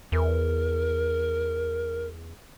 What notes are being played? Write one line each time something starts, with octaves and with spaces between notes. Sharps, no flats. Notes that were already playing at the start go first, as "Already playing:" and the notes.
E2 A#4